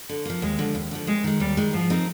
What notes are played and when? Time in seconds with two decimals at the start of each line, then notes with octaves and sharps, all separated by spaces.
0.09 D3
0.25 F3 A#3
0.42 D#2 G#3
0.59 D3 F3
0.75 D#2
0.91 D3 F3
1.07 D#2 G#3
1.24 D#3 G#3
1.40 D#2 G3
1.57 D#3 G#3
1.73 G#2 F3
1.90 F3 C4 D#4 A#4